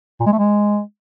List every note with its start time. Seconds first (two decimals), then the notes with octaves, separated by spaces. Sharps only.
0.20 A#2
0.26 G#3
0.32 A3
0.38 G#3